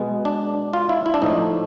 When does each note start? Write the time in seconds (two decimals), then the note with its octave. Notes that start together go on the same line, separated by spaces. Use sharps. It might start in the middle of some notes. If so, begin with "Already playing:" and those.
Already playing: B2 G#3 B3
0.25 D4
0.73 F4
0.89 E4
1.06 E4
1.14 D4
1.22 A2 F3 A3 D#4